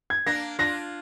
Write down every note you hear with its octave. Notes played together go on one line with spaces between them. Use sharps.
G#6
A#3 D4 A#6
D4 F4 A#6